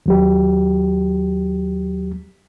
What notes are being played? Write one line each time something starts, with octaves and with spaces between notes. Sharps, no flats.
D#2 F#3 G4